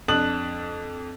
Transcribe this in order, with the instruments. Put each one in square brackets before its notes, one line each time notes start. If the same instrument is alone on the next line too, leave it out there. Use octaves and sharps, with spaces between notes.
[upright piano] F2 D4 A5 D#6 F#6 F#7